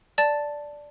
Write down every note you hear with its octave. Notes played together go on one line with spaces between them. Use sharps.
D5 A5 A6